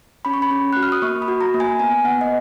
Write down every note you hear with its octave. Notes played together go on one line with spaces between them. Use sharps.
C#4 B5
C#6
B5
C#4
F#4 F#6
F6
D#6
A#3 C#6
B5
F#4
A#5
A#3
G#5
B3 G#5
B3 F#5
D#5